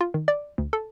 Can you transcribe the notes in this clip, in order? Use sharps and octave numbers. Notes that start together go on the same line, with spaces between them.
F4
D#3
D5
D2
A4